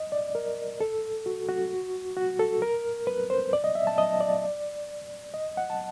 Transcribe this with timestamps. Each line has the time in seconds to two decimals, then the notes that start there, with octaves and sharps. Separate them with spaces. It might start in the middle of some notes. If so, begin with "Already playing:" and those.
Already playing: D#5
0.12 D5
0.35 A#4
0.81 A4
1.26 F#4
1.49 F#4
2.17 F#4
2.39 A4
2.62 A#4
3.07 B4
3.30 C5
3.53 D5
3.64 D#5
3.75 E5
3.87 A5
3.98 D#5
4.21 D5
5.34 D#5
5.57 F#5
5.70 A5